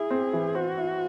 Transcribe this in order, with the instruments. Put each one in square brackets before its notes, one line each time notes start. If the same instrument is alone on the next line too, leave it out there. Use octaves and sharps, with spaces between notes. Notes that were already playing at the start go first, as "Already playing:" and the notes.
Already playing: [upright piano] E4 [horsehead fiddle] G#4
[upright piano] C4
E3
[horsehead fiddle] F#4 [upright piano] C5
[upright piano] E4